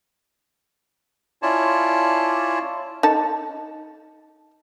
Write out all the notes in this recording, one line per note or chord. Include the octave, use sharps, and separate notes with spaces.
C#4 E4 F4 C#5 D5 A5
D#4 A4 A5